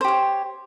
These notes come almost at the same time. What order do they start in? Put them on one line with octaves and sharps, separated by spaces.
C5 G4 C#5